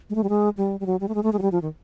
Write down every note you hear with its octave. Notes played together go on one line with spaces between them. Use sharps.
G#3
A3
G3
G#3
G3
G3
F#3
G3
A3
G#3
A3
G#3
F#3
G3
F3
D#3